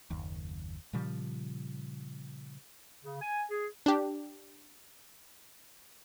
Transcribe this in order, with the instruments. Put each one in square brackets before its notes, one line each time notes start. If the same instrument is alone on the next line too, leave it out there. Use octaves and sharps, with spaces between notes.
[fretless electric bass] F#1 D#2
A#2 C#3 F3 G3
[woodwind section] C#3
G#5
G#4
[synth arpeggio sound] D4 G4